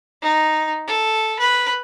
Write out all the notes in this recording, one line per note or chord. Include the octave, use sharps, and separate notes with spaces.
D#4
A4
B4